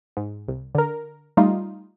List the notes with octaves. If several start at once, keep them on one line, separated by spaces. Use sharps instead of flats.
G#2
C2
D3 A#4
G3 A3 D#4 F4